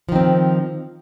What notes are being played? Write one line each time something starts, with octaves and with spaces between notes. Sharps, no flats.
D#3 F3 C4